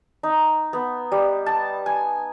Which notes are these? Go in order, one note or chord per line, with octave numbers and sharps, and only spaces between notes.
D#4
B3
G3
A5
G#5